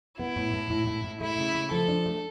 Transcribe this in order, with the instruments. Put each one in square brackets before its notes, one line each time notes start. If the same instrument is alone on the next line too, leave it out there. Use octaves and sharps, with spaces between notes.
[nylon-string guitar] B3 [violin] E4
[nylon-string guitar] A2
A2
A2
A2
A2
[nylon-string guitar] A3 [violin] E4
[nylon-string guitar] C#3
A3
[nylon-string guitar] F3 [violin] A4
[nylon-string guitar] D4
A3